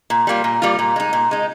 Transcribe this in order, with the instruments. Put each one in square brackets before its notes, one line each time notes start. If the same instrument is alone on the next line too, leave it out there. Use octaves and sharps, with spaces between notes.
[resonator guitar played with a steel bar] A#2
G3 A#3 F4
A#2
G3 A#3 F4
A#2
G#3 D#4
A#2
G#3 D#4